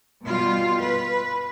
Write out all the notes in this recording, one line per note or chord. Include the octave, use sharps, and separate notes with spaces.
B2 G3 F4
B4